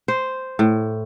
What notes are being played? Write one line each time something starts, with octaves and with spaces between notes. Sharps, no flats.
C5
A2